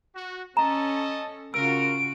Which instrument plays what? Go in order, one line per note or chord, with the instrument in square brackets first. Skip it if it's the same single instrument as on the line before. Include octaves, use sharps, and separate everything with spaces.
[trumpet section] F#4
[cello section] C#4 A4 [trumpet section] D#5 A5 [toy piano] A#5
[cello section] C#3 F4 F#4 [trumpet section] A#4 [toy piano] E6 [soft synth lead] D7